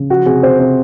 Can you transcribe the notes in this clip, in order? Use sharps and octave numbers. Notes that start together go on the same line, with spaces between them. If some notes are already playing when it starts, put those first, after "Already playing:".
Already playing: C#3
F3 F#4
C3 G#4
C3 C5
C3